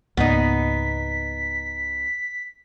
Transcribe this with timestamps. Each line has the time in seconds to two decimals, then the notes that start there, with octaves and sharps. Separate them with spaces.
0.17 C#2 G#2 A#3 B3 D#4 B6